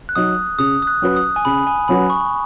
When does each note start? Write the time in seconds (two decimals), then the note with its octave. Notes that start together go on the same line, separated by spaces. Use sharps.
0.09 F#6
0.16 F#3 D#4 D#6
0.58 C#3 D#6
0.82 D#6
0.87 F#6
1.02 F#3 C#4 F#4 B4
1.16 D#6
1.36 G#5
1.45 C#3 B5
1.67 G#5
1.88 F#3 C#4 F#4 B4 B5
2.10 C#6